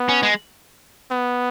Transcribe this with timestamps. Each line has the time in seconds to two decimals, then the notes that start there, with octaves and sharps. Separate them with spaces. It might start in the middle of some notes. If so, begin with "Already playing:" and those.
Already playing: B3
0.09 C#4
0.23 G#3
1.11 B3